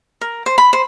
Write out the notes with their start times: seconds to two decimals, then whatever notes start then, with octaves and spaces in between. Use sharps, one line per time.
0.21 A#4
0.46 C5
0.58 B5
0.73 C5